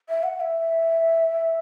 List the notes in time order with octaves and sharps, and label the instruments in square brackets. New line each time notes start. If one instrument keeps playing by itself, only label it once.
[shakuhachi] E5
F#5
F#5
E5